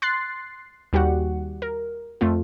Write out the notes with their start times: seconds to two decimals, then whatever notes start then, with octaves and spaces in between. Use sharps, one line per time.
0.02 C6 F#6 A6 C7
0.93 D#2 G3 F#4 G4 F#5
1.62 A#4
2.21 F2 A3 F4